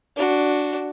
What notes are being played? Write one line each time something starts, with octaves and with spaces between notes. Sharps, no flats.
D4 F#4